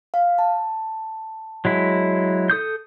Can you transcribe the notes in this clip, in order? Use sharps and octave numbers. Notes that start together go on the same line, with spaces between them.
F5
A5
F#3 G#3 E4
A4 D#6 G6